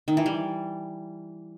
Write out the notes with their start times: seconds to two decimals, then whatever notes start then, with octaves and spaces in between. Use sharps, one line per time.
0.08 D#3
0.17 E3
0.26 G3